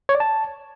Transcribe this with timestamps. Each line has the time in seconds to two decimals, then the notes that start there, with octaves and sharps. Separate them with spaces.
0.09 C#5
0.15 D5
0.20 A5